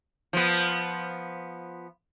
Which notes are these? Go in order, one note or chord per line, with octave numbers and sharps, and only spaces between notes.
F3 B3